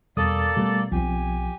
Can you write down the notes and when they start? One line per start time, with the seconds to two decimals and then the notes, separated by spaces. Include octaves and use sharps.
0.17 E2 B2 G3 A#3 A4 D5 D#6
0.56 B2 G3 A3
0.92 B1 F3 C4 G4 G#5